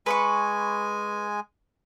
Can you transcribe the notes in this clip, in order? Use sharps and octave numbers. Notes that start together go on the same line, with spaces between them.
G#3 B4 G#5 B5 C#6